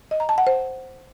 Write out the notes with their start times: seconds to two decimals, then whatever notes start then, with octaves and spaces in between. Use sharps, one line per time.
0.11 D#5
0.20 A#5
0.29 A5
0.38 F#5
0.47 C5